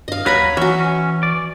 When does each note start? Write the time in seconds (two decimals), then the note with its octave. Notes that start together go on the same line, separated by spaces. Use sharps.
0.08 G2 D#5 F5
0.26 D#2 F#3 B4 C#5 A#5 B5
0.57 E3 F#3 C#4 F#4 E5
0.80 C#4
1.23 D5